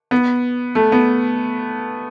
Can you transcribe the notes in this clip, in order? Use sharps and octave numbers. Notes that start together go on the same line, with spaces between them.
B3
A3
B3